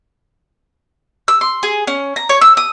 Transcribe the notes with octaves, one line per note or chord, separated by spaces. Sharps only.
E6
C6
G#4
C#4
A#5
C#5
E6
D#6